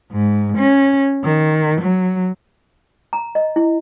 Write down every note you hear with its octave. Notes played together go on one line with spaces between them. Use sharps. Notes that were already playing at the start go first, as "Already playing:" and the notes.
G#2
C#4
D#3
F#3
A#5
D#5
E4